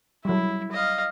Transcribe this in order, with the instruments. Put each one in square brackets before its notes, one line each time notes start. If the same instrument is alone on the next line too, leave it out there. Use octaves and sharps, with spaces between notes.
[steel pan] F#3 G3 [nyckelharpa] E4
[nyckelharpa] D#5 F5